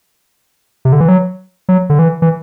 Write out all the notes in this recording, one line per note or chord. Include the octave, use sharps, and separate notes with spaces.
C3
D3
E3
F#3
F#3
D3
E3
E3